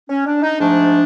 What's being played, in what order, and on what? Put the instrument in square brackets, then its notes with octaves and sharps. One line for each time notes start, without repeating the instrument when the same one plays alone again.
[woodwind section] C#4
D4
D#4
G#2 F3 A3 D4